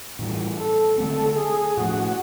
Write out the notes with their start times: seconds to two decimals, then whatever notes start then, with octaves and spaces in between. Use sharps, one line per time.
0.19 A2 E3 G3
0.58 A4
0.98 D3 F#3 A3 C4 A4
1.38 G#4
1.77 A2 F3 A3 F#4